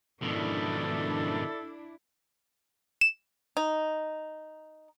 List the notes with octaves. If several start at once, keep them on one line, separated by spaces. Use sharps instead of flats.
G#2 B2 D#3 F3 D4 E4 A4
E7
D#4